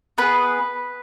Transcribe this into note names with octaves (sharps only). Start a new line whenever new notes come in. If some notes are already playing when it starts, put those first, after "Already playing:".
B3 G#4 B4